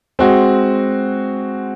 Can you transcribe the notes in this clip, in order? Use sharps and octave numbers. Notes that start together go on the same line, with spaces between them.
G#3 C4 F#4